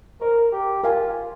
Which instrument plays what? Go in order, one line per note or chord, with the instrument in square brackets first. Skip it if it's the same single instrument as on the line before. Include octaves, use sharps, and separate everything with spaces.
[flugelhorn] A#4 [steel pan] C5 D#5 A#5 C#6
[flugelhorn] G4
[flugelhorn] F4 [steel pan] A#4 F5 G#5